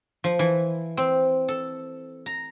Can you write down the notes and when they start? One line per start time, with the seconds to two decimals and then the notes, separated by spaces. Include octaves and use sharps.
0.24 F3
0.39 E3
0.97 C4
1.48 A4
2.26 A#5